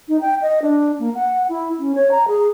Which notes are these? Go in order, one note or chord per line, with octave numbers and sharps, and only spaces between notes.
D#4
G5
D#5
D4
A#3
F#5
E4
C#4
C#5
A#5
G#4